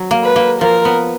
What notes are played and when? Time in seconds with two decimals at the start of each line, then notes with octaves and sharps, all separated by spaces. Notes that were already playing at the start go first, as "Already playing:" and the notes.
Already playing: F#3
0.11 A#3
0.24 B4
0.36 A#3
0.61 F3 A#4
0.85 B3